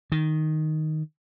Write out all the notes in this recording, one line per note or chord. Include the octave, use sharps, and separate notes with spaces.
D#3